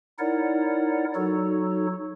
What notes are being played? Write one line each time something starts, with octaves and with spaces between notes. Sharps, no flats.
D#4 E4 A#4 C#5 D5 F#5
F#3 D#4 F#4 A4 C#5